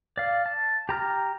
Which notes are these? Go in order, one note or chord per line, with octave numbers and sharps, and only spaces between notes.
D5 F5
A5
G4 A#5 F6